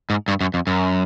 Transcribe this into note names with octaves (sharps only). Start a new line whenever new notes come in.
G#2
G2
F#2
F2
F#2